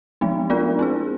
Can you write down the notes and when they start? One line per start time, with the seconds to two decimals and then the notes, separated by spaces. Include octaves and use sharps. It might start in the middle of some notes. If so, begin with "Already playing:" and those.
0.21 F3 G#3 B3 D#4
0.50 B3 D4 F4 A#4 D5
0.79 C4 E4 G#4